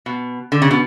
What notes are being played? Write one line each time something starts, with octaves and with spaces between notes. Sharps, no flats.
B2
D3
C#3
B2